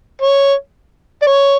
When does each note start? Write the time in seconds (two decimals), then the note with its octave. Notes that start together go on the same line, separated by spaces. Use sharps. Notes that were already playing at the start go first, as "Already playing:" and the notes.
0.22 C#5
1.22 D5
1.27 C#5